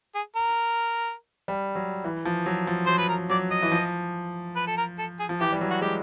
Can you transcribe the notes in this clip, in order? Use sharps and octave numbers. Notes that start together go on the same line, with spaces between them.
G#4
A#4
G3
F#3
E3
F3
F#3
F3
F#3 C5
B4
A#4
F#3 D5
D#5
E3
F3
B4
A4
A#4
A4
G#4
F3
E3 G4
G3
F#3
F#4
G#3 G4